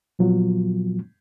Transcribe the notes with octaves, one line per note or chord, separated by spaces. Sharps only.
A#2 F3 F#3 B3 F4